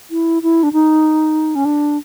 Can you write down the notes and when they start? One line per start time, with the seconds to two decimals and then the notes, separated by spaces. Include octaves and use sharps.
0.11 E4
0.43 E4
0.63 D4
0.73 D#4
1.55 C#4
1.65 D4